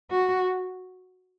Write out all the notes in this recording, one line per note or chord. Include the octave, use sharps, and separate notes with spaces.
F#4